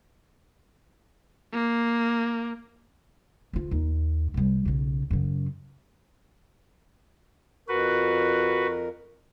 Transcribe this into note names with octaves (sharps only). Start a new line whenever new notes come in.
A#3
D2 F4
D#2
C2 G3
B1 C#3
F#2 C#3
F2 F#4 A#4 B4